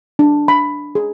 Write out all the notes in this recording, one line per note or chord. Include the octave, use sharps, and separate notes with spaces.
D4
B5
G#4